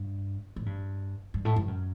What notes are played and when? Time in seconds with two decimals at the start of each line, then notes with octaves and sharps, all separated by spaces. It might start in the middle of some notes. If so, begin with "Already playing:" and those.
Already playing: G2
0.56 A2
0.66 G2
1.34 G2
1.45 A2
1.56 G2
1.68 F#2